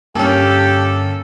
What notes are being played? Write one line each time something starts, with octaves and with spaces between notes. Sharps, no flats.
G2 D3 A#3 C#4 G4 A4